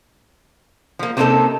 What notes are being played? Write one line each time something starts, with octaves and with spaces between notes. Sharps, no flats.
F3 A#3
C3 A#3 C4 C#4 D#4 A4